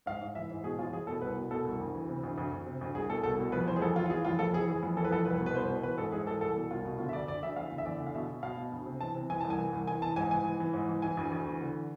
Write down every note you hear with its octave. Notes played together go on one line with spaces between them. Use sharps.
G#2 F5
G#2
E3 E5
G#2
B2 G#4
E2 F4
E2 G#4
B2 A4
C2 B4
B2
B2 A4
C2
D2
E3
C3
D2
D2
D2
C3
D2
C2 G#4
B2 A4
C2 A4
B2
F2 B4
E3 C5
G#4
F2 A4
E3 F4
F4
E3 G#4
F2 F4
F2 A4
E3 G#4
E3 G#4
F2
E3 A4
B4
F2 A4
C2 B4
B2
B4
C2 C5
B2
E3 B4
G#2 A4
G#2 G#4
E3 A4
C2 A4
B2
C2 F4
B2
D3 F4
E5
D2 D5
D2 D5
D2 E5
E2 F5
D3
E5
E2 D5
D3
F5
B2 E5
B2
B2 F5
B2
D2
C3
E3 A5
C3
E3 G#5
C2 A5
G#5
E3
C2
E3 G#5
E3 A5
G#2 G#5
E3 G#5
E3
E3
G#2
E3
E3 G#5
D2
D2
E3
D3